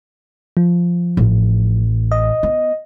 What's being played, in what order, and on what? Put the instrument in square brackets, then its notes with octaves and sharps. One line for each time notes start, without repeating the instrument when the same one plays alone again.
[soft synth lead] F3
[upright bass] A1
[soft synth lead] D#5
[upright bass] B3